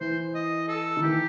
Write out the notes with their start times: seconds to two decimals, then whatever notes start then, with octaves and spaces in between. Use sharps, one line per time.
0.01 E3 C5
0.35 D#5
0.68 A4
0.97 D#3
1.03 E3 G4